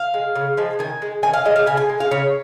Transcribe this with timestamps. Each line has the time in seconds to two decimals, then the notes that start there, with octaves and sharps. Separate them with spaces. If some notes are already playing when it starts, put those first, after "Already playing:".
Already playing: F5
0.14 G#3
0.35 C#3
0.57 F3 G#3
0.79 D#3 G#5
1.02 G#3
1.23 D#3 G#5
1.34 F5
1.45 G#3 D#5
1.56 F5
1.66 C#3 G#5
1.77 G#5
1.89 G#3
2.00 F5
2.11 C#3 C#5